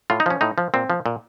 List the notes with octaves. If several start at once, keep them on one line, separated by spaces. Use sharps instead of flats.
A2 F4
D#4
F3 C#4
A2 D#4
F3
A#2 C4
F3
A#2